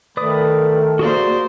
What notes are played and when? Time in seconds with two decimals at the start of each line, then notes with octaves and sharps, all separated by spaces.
0.17 D#3 A3 B4 D5 D#6
0.99 A#3 F#4 G#4 C5 D5